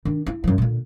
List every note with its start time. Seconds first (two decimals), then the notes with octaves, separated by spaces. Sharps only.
0.05 D#3 D4
0.26 E4
0.44 F#2 F3
0.58 A#2 D3